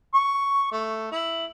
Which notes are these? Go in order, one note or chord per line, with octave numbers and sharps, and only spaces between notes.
C#6
A3
E4